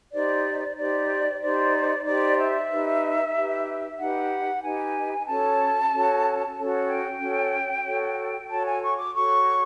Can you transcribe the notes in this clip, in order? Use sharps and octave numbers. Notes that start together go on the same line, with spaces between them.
D#4 G4 C5 D5
D#4 G4 C5 D5
D#4 G4 C5 D5
D#4 G4 C5 D5
E5
D#4 G4 B4
D#4 G4 B4
D#4 G4 B4 F#5
D#4 G4 B4 G#5
C#4 F#4 A4 C#5 A5
C#4 F#4 A4 C#5
C#4 F#4 A4 C#5
G5
C#4 F#4 A4 C#5
F#4 A4 C#5
F#4 A4 C#5 A5
G#5
C#6
D6
F#4 A4 C#5 C#6